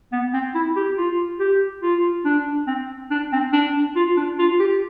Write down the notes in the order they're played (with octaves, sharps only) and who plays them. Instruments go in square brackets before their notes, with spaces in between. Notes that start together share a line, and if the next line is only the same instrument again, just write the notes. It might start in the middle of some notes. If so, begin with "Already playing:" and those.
[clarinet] B3
C4
E4
G4
F4
G4
F4
D4
C4
D4
C4
D4
F4
D4
F4
G4